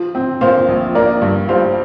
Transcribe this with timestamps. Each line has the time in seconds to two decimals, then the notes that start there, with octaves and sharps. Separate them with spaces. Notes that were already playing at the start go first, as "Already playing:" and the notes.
Already playing: F3
0.15 C4
0.41 A#2 C5 F5
0.68 A#1
0.95 A#3 A#4 D5
1.22 G2
1.49 G3 C5 F5